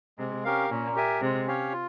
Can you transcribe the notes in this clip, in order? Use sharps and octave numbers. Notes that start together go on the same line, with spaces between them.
C3 G#3
C#4 G4 A#4 F5
A#2 C#4
G4 A#4 E5 G#5
C3 G#3
C#4 G4 C#5 F5
F4